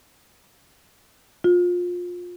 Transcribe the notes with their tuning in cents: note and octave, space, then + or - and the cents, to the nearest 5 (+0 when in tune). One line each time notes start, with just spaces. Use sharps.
F4 +25